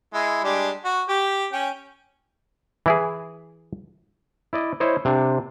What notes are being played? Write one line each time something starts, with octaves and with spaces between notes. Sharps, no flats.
G#3 E4
G3 G#3 D4
F#4
G4 G5
C#4 G5
E3 E4 G#4
E4 D5 D#5
E4 C5 C#5 D#5
C3 C4 D4